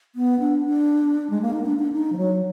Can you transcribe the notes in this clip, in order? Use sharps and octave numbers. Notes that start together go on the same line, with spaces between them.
B3
D4
D4
G#3
A#3
D#4
B3
D4
D4
D#4
F3
F#3